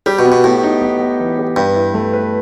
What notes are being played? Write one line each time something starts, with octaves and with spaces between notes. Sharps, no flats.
G3 G4
B2
B3
B2
A2 B3
D#4
B3
B3
E3
G4
G2 B4
E4
A3
B4